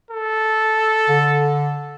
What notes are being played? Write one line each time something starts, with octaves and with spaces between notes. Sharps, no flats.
A4
D3